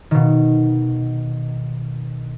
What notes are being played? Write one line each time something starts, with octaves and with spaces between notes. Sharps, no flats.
B2 D#3